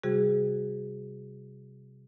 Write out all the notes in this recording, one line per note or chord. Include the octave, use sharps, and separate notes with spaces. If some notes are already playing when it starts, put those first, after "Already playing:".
C3 G3 F#4 G#4